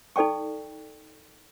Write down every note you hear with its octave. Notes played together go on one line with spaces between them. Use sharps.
D#4 A4 D5 G5 C#6